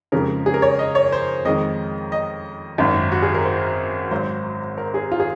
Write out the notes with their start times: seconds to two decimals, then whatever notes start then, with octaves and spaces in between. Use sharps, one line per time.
0.12 F2 C#3 F3 G#3 A#4
0.46 G#4
0.54 A#4
0.62 C#5
0.79 D#5
0.95 C#5
1.12 C5
1.45 F2 D#3 G#3 D#5
2.12 D#5
2.78 G#1 F#2 D#3
3.12 F#4
3.22 G#4
3.34 A#4
3.45 C5
4.11 G#1 G#2 F#3 C5
4.77 A#4
4.94 G#4
5.12 F4
5.20 G#4